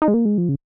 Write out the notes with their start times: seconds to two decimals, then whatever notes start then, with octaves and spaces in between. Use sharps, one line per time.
0.02 D#4
0.08 G#3
0.14 A#3
0.25 G#3
0.38 F3
0.49 C#3